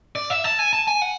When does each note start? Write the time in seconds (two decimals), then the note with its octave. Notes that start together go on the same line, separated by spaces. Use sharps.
0.16 D5
0.30 E5
0.44 A5
0.59 G#5
0.73 A5
0.87 G#5
1.02 F#5